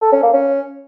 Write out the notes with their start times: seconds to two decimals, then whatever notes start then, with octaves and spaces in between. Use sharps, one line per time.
0.02 A4
0.12 C#4
0.23 A#3
0.33 C#4